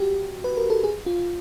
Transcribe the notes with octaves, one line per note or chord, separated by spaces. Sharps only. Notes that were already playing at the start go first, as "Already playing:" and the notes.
Already playing: F#4 G4
B4
A#4
A4
G#4
F4